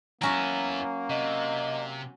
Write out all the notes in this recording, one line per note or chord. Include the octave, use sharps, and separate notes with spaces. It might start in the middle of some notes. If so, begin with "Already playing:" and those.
F#3 A#3 B3 C#4 E4 F#4
C3 D#5